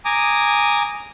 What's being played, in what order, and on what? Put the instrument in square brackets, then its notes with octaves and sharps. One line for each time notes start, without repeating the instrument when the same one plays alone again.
[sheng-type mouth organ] G#5 A#5 D6 D#6